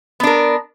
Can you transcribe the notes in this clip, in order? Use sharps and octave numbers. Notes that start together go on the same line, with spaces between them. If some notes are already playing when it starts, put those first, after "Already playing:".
B3 D4 A#4